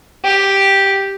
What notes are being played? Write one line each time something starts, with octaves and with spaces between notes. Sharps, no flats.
G4